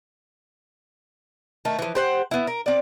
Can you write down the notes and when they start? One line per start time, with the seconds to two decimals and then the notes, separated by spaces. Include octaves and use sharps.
1.65 D#3 A3
1.79 E3 F3
1.95 G4 C5 F#5
2.31 B3 E4
2.47 A#4
2.66 C4 D5